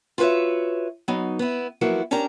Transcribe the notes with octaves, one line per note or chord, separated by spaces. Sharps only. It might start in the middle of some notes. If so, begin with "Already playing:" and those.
F4 F#4 B4 C#5 E5
F#3 B3 D#4
B3 E4
F3 F#3 A#3 B3 E4 F#4
C#4 D4 G4 A#4 A#5